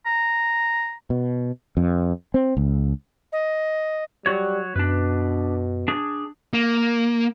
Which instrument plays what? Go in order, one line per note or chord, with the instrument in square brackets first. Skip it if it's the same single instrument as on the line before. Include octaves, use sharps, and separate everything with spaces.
[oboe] A#5
[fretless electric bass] B2
F2
C4
C#2
[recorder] D#5
[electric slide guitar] F#3 F#4 C#5 [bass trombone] G3
[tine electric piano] F#2 [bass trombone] B2 [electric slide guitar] D4 B4
[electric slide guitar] D4 G#4
[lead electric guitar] A#3